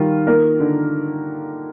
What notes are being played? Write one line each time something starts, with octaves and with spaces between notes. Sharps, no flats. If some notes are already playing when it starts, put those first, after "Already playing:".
Already playing: D#3 G3 F4
A#3 A#4
D3